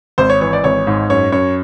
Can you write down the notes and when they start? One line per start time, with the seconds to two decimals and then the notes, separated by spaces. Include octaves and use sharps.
0.18 G#1 C5
0.30 C#5
0.41 E3 C#5
0.53 D5
0.64 G#1 C#5
0.87 G#2
1.10 F#2 C#5
1.32 F#2 C#5